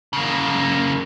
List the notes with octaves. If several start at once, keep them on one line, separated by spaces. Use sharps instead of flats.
C#3 A#3